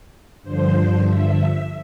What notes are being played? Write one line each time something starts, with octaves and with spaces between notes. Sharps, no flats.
G2 D3 F3 C5
E5